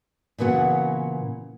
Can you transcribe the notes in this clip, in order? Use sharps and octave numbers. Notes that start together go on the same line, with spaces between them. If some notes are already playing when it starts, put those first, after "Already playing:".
A#2 C#3 E3 B3 F#4 F#5